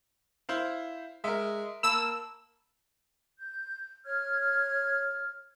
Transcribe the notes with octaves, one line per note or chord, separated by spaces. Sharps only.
E4 C5 F5
G#3 A#4 E5
A#3 A5 B5 E6
G6
C#5 F6 G#6